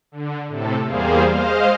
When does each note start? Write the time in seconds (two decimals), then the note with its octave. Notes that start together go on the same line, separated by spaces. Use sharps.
0.12 D3
0.48 A2 C3 A4
0.85 E2 G3 A#3 G#4 C5 F5
1.30 G#3 C5 D#5 F5 F6